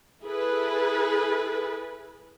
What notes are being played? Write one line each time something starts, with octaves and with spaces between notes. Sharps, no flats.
E4 G#4 A4 B4